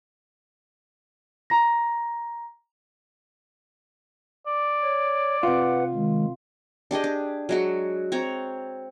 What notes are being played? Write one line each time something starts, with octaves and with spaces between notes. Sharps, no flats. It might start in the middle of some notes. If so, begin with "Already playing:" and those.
A#5 A#6
D5
C#5
C3 F4 B4 F#5
D#3 G#3
D4 G4 G#4 D#5
D4
F#3 G#3 F#4
C4 C#5 A#5